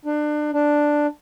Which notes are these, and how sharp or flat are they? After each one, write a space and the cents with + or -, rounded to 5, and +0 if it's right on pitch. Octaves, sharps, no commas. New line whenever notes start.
D4 +30
D4 +5